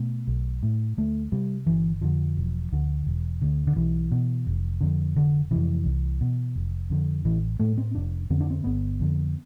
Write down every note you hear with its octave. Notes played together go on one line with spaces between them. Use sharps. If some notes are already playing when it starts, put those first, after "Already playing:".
Already playing: B2 A3
B1
A2
D2 A3
C3 G3
G1 E3
F2 D3 F3
E1
D2 D3
E1
D2 D3
D3
B1 E3
B2
F1
F2 D3
F1 D3
F2 C3 E3
C2
B2
F1
F2 D3
A1 E3
A2 A3
C4
F1 D4
F2 D3 C4
D4
C4
G1 B3
F2 D3